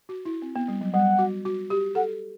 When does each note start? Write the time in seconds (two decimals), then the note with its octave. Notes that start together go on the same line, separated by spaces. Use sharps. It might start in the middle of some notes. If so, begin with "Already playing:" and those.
0.09 F#4
0.25 E4
0.42 C4
0.56 B3
0.68 G3
0.81 F#3
0.94 G3 F#5
1.19 F#4
1.45 F#4
1.70 G4
1.95 A4 F#5